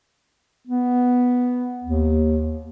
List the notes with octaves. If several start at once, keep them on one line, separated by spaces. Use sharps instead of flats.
B3
D#2